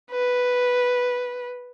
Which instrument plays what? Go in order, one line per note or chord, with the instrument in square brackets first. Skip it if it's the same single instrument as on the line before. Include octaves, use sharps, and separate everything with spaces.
[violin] B4